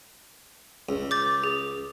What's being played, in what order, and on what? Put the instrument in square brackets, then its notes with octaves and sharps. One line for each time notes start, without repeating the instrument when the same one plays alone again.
[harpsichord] C#2
[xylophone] D6 G6 A6
G#4